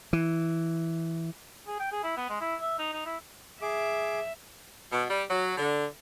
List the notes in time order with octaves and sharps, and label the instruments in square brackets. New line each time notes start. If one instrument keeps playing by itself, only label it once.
[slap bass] E3
[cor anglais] G#4
G5
G#4
E4
B3
G#3
E4
E5
D#4
D#4
E4
[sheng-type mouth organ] G#4 D6 [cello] E5
[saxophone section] B2
G3
F#3
D3